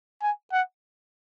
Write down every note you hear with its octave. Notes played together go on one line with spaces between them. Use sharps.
G#5
F#5